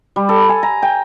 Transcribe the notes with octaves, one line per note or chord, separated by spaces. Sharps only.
G3
A4
G#5
A#5
G5